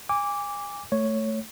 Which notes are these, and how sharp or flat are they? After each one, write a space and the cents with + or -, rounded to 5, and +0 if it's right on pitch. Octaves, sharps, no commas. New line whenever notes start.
G#5 -30 D6 -10
A3 +0 C#5 +0